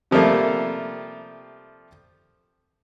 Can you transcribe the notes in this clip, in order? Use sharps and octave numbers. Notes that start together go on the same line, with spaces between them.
C3 F3 G3 A3 A#3